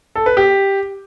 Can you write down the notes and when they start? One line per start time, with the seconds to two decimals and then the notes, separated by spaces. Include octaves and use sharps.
0.15 A4
0.26 B4
0.37 G4